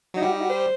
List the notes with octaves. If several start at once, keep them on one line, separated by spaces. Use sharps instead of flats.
F#3 D#4
G3 F#4
D#4
F#4
C5